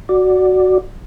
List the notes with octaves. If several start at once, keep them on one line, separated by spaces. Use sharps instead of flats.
F#4 D5